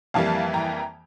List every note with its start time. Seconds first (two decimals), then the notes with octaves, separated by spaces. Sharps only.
0.14 F2 E3 G3 A#3 F5 A5
0.54 G5 A#5